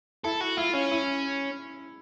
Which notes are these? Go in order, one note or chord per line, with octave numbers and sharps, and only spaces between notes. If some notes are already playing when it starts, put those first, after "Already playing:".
E4 A4
F#4
E4 F4
C#4
E4